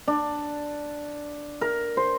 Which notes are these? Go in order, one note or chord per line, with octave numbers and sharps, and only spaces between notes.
D4
A#4
C5